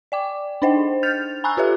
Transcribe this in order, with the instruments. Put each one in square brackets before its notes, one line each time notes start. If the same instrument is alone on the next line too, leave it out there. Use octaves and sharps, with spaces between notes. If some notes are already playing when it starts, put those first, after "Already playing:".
[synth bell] D5 G5 D6
D4 D#4 C5 D#5 G5
F6 G6 A6 F7
G#5 A#5 B5 C#6 E6 F#6
F4 G4 A4 B4 E5